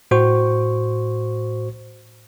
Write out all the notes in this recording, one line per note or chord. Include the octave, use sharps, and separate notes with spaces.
A2 F#4 C5 C#6